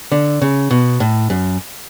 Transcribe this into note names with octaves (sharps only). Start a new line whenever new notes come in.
D3
C#3
B2
A2
F#2